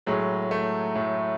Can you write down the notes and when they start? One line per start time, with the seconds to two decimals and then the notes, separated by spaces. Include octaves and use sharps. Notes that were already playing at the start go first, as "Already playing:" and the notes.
0.07 A2 F#3 G#3
0.51 A3
0.95 A2 F#3